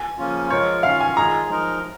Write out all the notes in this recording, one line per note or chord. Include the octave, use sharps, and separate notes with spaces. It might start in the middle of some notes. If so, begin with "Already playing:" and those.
Already playing: G#5
C#3 F3 A#3 C#4 F4
F3 G#3 F4 A#4 C#5
D#3 C#4 F4 F5
G#5
D#3 G#3 F4 G#4 A#5
F3 G#3 D#4 A#4